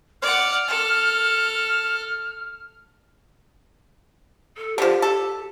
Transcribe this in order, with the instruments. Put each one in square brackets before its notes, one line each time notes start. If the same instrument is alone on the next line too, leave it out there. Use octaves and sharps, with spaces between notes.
[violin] D5 F#5 [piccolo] F6
[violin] A4
[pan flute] A4
[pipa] D3 F3 [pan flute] G4
[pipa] A4